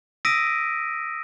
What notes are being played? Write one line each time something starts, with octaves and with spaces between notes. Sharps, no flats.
D#6 E6 A#6 B6 D7 D#7